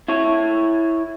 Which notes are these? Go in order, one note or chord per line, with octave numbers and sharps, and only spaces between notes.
E4 C#5